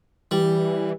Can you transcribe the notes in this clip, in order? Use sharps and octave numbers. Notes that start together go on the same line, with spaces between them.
E3 G3